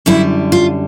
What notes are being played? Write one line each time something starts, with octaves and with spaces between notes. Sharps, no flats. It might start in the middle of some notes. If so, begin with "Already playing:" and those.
F#2 D3 G3 E4
F4